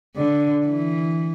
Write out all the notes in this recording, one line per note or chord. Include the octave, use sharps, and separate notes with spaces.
D3
E3